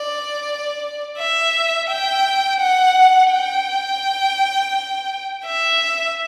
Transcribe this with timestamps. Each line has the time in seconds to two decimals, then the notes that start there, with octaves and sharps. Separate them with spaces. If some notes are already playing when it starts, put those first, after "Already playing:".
Already playing: D5
1.18 E5
1.89 G5
2.60 F#5
3.32 G5
5.45 E5